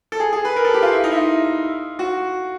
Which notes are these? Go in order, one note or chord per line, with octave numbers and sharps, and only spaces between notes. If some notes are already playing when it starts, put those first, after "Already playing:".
A4
G#4
G#4
B4
A#4
A4
G4
F4
E4
D#4
E4
F4
F#4